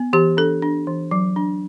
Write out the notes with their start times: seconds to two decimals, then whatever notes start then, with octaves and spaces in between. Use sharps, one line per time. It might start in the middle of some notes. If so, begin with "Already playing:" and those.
Already playing: B3
0.13 E3 G4
0.37 D4 A4
0.62 D4
0.87 E3
1.11 F#3
1.36 D4